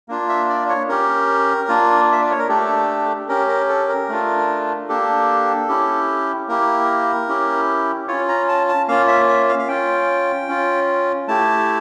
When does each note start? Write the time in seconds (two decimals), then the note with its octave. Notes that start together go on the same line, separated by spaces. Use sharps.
0.09 A#3 D4 F4
0.29 E5
0.50 D5
0.69 C#5
0.89 C#4 G4 A#4
1.69 A#3 D4 F4
2.12 E5
2.21 D5
2.30 C#5
2.39 A#4
2.49 A3 D4 G4 A4
3.28 C#4 G4 A#4
3.48 A#4
3.69 A4
3.89 A#4
4.09 A3 D4 F4
4.88 A#3 D4 G4 A4
5.68 C#4 E4 G4
6.48 A#3 E4 G4 A#4
7.28 C#4 E4 G4
8.08 C#4 F4 C#5
8.29 A#5
8.49 A5
8.68 A5
8.88 A#3 C#4 F4 F5
9.08 E5
9.28 E5
9.48 F5
9.59 F5
9.68 C#4 F4 G5
10.49 C#4 F4
11.28 A3 E4 G4 A5